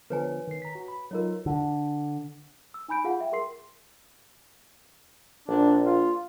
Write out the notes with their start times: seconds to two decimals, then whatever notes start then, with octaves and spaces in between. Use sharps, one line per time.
0.10 D3 F3 B3 B4 C#5 G#5
0.48 D#3 C7
0.62 A#5 B6
0.75 F#4
0.88 B5
1.11 F#3 D#4 F4 A#4 C#5
1.46 D3
2.74 E6
2.88 D#4 G#5 B5 G6 D7
3.04 F4 G#4 F5 F#5
3.20 E5 G5
3.32 G#4 A#4 C6 C7
5.48 A#1 D4
5.86 F4